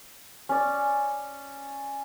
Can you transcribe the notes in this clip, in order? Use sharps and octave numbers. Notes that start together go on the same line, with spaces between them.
C#4 D5